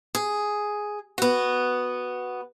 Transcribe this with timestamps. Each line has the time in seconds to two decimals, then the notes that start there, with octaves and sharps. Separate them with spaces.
0.15 G#4
1.18 B3 F#4